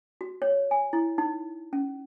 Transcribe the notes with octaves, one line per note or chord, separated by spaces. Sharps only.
F#4
C#5
G#5
E4
D#4
C#4